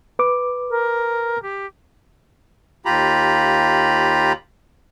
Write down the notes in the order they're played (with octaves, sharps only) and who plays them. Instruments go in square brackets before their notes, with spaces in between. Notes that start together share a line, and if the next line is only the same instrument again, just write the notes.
[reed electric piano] B4 D6
[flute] A#4
G4
[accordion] D#2 F4 G4 A#5 B5